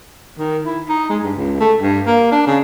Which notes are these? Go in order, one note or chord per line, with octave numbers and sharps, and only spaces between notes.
D#3
E4
D#4
G#3
G2
C#2
A3
G2
A#3
D4
C#3